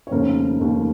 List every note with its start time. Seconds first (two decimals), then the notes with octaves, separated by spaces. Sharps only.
0.07 C#5
0.11 F1 D#2 C#3 A#4 C5
0.60 F1 D#2 C#3